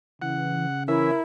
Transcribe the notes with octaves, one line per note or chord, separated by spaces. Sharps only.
C#3 E3 F#5
E3 C#4 E4 A#4 E5